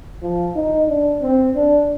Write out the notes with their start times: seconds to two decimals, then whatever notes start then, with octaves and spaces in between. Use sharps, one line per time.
0.23 F3
0.55 D#4
0.88 D4
1.22 C4
1.56 D4